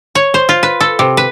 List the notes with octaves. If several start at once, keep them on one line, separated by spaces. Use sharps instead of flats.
C#5
C5
F4
B4
A4
C3
B4